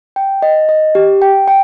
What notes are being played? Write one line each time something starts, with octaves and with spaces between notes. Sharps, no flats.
G5
D#5
D#5
G4
G5
G5